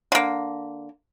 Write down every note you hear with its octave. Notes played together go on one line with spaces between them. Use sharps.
D3 A#3